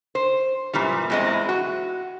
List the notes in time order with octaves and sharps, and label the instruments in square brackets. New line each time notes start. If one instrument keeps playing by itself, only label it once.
[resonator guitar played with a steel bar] C5
F#2 A#2 E3 G3
E2 E3 G#3 C4 D#5
F#4